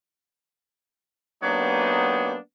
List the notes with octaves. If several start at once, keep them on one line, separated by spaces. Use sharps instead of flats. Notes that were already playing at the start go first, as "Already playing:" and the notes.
F#3 A#3 B3 D4 D#4 G4